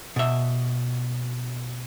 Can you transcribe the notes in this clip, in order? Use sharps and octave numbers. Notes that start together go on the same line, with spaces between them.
B2 E5